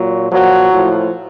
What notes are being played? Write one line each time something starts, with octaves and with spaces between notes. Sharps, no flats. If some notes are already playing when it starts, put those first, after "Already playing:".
Already playing: A#2 F#3
A#2 F3 F#3
A2 F3